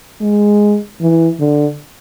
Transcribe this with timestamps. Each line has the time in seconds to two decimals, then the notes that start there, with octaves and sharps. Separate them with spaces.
0.21 G#3
1.01 E3
1.39 D3